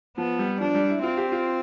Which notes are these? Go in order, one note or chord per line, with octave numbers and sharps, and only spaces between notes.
F3 B3
G3
F3 D4
G3
E4
C4 F4
G4
F4